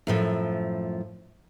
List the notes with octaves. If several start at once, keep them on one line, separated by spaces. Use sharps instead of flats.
F#2 A2 F3